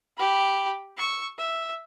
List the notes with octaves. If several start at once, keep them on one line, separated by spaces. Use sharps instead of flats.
G4 B5
C#6 E6
E5